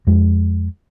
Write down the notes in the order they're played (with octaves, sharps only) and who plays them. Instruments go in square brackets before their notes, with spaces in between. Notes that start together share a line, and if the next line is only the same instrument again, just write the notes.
[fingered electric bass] F2 G#3